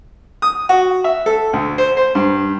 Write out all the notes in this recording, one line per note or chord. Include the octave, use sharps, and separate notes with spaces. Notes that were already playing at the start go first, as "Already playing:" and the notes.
D#6
F#4
E5
A4
D2
C5
C5
G2